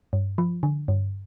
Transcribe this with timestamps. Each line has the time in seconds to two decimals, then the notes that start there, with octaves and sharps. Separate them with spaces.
0.13 G2
0.38 F3
0.63 D3
0.88 G2